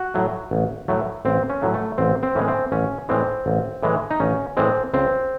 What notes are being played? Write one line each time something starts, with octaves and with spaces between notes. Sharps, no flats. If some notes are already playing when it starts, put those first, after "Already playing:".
Already playing: F#4
A2 F#3 A3
A1
A2 F#3 A3
A1 C4
C#4
A2 F#3 A3
A3
A1 C4
C4
A2 E3 G#3 C#4
C4
A1 C#4
A2 E3 G#3 C4
A1
A2 E3 G#3
D#4
A1 C#4
A2 E3 G#3 C4
C#2 C4